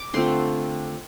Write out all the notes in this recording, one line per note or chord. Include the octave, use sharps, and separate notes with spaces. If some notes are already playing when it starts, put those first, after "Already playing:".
Already playing: D6
D3 A3 C4 F4 C6